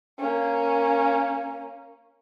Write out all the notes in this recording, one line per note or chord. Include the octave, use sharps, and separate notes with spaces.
A#3 C#4